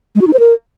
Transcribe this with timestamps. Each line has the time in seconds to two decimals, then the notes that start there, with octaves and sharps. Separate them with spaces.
0.15 G#3
0.21 F#4
0.27 D#4
0.33 C5
0.39 A#4